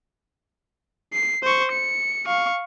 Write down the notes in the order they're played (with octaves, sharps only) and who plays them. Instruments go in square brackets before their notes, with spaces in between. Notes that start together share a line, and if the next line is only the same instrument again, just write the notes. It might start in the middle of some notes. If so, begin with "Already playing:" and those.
[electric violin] C7
C5 C#6
C#7
F5 C#6